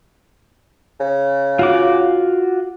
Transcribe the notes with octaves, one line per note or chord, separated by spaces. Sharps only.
C#3
F4 F#4 D6